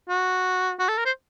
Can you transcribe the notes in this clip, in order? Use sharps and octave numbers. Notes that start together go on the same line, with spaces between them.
F#4
F#4
A4
A#4
C5